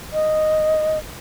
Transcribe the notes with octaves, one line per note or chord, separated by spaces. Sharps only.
D#5